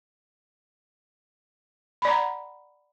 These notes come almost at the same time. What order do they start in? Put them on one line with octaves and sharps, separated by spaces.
B5 D5 A#5 F#5